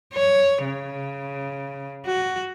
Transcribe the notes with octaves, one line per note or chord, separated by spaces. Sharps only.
C#5
C#3
F#4